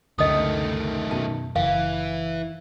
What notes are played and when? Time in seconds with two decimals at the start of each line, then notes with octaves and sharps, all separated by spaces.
0.19 C#2 F#2 D3 D#3 A3 D#5 D#6
1.11 F#2 B2 A5
1.56 F#1 E3 F5